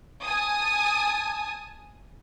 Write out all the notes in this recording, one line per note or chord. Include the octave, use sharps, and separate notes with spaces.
G#5 A5 D#6